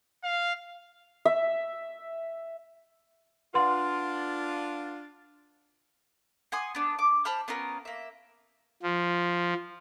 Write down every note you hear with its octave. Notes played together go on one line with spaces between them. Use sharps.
F5
E5
D4 F4 B4 F#5 C6
F#5 G#5 C6 D#6
B3 D4
D6
C5 A5 B5 F6
B3 C#4 F4 A#4
A#3 E5
F3